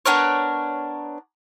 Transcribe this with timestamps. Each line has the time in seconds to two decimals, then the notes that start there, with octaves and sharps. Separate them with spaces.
0.05 B3 D4 A#4 C#5